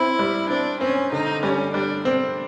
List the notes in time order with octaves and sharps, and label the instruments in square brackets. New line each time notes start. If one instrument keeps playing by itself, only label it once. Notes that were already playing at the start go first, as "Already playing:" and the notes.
Already playing: [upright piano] C4 [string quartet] E4
[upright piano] G3
[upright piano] C4 [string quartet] D4
[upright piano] C4 [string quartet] C#4
[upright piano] D3 [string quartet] D#4
[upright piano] G3 [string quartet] C#4
[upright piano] G3 [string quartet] D4
[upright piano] C4 [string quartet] D4